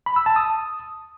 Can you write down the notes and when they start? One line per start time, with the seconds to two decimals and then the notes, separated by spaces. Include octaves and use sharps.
0.06 B5
0.16 E6
0.26 A5
0.36 D#6